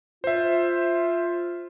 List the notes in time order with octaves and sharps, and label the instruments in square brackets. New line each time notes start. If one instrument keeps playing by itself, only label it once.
[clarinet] F4 [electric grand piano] C5 E5